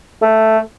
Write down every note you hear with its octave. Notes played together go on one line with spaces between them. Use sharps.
A3